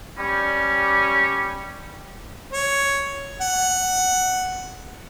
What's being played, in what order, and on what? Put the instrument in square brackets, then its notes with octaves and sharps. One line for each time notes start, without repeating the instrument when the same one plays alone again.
[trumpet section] G3 [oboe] C#4
[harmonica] C#5
F#5